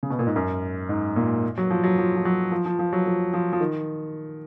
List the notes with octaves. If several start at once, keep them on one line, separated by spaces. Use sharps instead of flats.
C#3
B2
A#2
G#2
F#2
G#2
A#2
F#3
F3
F#3
F3
F3
F#3
F3
F3
F3
F#3
F3
F3
F3
D#3